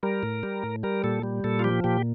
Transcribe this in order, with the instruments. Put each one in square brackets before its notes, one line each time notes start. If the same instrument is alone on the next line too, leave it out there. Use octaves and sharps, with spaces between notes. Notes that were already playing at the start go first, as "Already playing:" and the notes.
[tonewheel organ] G3 A#4
A2
G3
A2
G3 A#4
A#2 A4
G3
A#2 A4
F4
F3 G4
A#2 G4